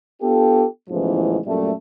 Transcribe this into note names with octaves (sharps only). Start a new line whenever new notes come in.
B3 D4 F4 G4 A4
A1 E2 G#2 C#3 E3 F3
F#2 A#2 G3 A3